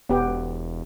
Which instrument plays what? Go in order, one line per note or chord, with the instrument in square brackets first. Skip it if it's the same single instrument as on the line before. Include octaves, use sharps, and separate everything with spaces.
[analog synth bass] E1 [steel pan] B3 G4